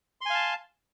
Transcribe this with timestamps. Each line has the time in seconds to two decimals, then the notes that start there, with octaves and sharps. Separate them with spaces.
0.21 C6
0.26 G#5
0.30 F5
0.35 A5